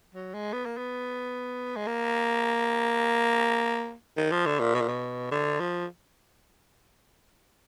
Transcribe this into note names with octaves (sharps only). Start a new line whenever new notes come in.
F#3
G#3
B3
A#3
B3
G#3
A#3
D#3
F3
D3
A#2
B2
A#2
B2
D3
F3